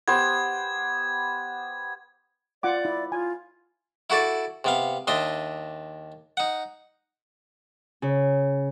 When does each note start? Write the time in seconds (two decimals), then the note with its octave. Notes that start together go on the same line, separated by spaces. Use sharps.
0.08 B3 G4 C5 G#6
2.63 F4 D5 F#5 D6
2.85 E4
3.12 F4 G#5
4.10 E4 F#4 A4 D5
4.64 C3 B3 F5
5.07 D#2 D4 D#5 E5 C6
6.37 D#4 F#5
8.02 C#3